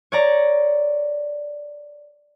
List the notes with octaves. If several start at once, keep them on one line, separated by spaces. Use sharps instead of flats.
C#5 D5 A#5